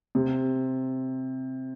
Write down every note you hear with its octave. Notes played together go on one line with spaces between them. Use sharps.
C3